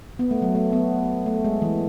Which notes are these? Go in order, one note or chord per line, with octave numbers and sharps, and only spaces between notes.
B3
A3
F#3
A3
B3
A3
G#3
E3